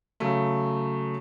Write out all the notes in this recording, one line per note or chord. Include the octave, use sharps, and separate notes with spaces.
C#3 F#3 A3